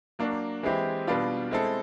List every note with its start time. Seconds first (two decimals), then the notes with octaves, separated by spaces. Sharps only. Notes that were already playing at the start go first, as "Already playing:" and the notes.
0.19 F#3 A#3 D4 F#4
0.63 E3 G#3 C4 E4 G4
1.07 B2 G3 B3 D4 F4
1.51 G#3 C4 E4 A4